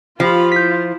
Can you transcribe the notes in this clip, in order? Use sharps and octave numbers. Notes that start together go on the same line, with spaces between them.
F3 F4 G4 B5
E4 G6 B6